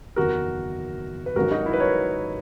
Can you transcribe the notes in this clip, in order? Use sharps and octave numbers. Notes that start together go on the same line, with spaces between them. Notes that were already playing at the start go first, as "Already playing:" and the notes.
F#1 E2 D#3 F#4 A#4
B4
G#1 G#2 D#3 F#3 C#4 F#4 A#4
D#4 F#4
E4
B4
A#4 C#5